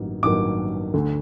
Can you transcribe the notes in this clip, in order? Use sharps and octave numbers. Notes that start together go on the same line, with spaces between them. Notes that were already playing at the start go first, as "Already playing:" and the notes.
Already playing: A1 G2 D#3 F#3 A#3
A1 G2 D#3 F#3 A#3 D6
D2 D3 A3